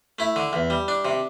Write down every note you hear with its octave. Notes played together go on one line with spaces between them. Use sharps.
A3 E4
D3
E2
G3
D4
C3